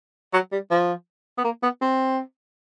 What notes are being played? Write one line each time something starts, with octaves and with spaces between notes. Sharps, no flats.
F#3
G3
F3
B3
A#3
B3
C4